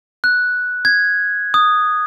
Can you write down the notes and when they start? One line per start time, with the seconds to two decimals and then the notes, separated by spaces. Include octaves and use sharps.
0.24 F#6
0.85 G#6
1.54 D#6